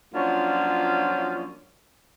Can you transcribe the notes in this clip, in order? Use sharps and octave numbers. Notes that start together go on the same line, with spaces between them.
F3 F#3 A#3 C#4 D4 F4